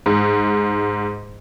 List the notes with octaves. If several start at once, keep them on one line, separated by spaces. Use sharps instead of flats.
G#2